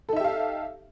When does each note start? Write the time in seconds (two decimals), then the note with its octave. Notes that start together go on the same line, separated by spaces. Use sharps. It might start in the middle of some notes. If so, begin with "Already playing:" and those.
0.09 A4
0.13 D#4
0.16 E5
0.20 G4
0.24 F5